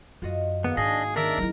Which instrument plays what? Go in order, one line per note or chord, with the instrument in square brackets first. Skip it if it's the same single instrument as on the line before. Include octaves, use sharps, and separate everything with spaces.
[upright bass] F#2 [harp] F4 F#4 D#5
[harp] G#1 A#3 C#7 [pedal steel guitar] B3
[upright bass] G#2 [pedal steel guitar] D4 D#5 [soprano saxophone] G#4 [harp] G#5
[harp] D#3 C#4 [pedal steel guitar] D4 D5 E5 [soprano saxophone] A#4
[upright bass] F#3 E4